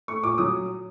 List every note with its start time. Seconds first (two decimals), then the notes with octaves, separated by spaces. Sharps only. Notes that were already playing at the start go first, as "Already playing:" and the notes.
0.08 A3 C#6
0.23 A#2 D6
0.38 F#3 D#6